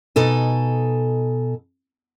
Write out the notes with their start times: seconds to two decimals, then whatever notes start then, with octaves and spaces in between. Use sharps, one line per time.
0.16 B2 D#4 A4 G#5